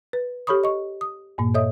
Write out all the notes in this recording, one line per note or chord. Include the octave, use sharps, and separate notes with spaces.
B4
G4 A4 C#5 B5 C#6 D#6
D#5 C#6
D#6
G2 A#2 A#3
A4 C#5 D#5 E5 D#6